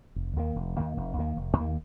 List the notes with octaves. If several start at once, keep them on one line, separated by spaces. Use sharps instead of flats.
F1
D#2 D#3 A#3
F1
D#2 D#3 A#3
F1
D#2 D#3 A#3
F1
D#2 D#3 A#3